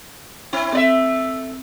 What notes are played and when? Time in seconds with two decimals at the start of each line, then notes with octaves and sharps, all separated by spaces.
0.53 C4 E4
0.73 A3 C4 D5 E5